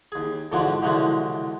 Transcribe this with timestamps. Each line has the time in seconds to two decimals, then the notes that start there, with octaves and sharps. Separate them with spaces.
0.12 D#2 G#4
0.52 F2 G#2 B2 D3 E3 F3
0.82 C2 B2 D3 E3 F3 G#3